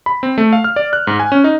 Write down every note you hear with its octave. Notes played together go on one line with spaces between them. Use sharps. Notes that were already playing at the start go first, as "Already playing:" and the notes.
B5
C4
A3
F5
F6
D5
F#6
G#2
G#5
C#4
D#4